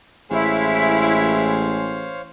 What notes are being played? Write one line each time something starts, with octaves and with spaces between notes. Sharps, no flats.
A1 G#3 E4 C5 C#5 F5